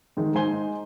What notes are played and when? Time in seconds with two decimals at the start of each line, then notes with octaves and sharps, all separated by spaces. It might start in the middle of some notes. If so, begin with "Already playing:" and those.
0.17 G#2 D#3 G#3
0.35 G#2 D#4 C5 G#5 C6 G7